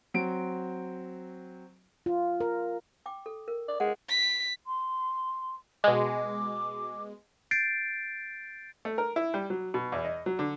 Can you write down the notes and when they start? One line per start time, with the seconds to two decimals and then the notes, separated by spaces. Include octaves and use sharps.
0.14 F#3 C4 D7
2.06 F4
2.41 A#4
3.06 G5 D6
3.26 A4
3.48 A#4
3.68 D5
3.80 G#3 F#5
4.09 B6
4.66 C6
5.84 B2 G#3 D6
7.51 G6 A6 C7 D7
8.85 A3
8.98 A#4
9.16 E4
9.34 G3
9.50 F#3
9.74 B2
9.92 E2
10.05 D#5
10.26 F#3
10.39 D3